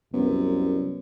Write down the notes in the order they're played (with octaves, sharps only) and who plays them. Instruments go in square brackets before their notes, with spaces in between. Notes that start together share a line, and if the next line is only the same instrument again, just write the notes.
[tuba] C2 [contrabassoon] F#2 [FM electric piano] B3